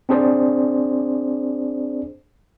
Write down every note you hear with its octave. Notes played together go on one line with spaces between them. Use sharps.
C4 D4 G#4 C5 D5